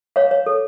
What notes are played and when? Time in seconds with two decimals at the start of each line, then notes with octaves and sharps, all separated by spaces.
0.16 C#5 F5
0.31 C#5
0.46 A4